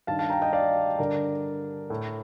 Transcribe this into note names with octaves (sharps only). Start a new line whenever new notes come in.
G2 D#3 F5 A5
F5 A5
G5 A#5
D#5 G5
D5 F5
G2 D3 A#4 D5
A2